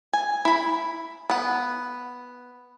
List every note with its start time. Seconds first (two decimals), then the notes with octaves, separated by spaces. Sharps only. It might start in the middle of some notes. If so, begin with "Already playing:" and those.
0.13 G#5
0.45 E4 B5
1.30 B3 F#5